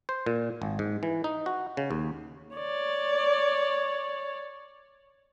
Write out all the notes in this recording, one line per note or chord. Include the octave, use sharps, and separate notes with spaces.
C5
A#2
G#1
G#2
E3
D#4
F#4
C#3
D#2
C#5 D5